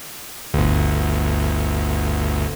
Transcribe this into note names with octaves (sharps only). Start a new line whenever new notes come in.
G1 D2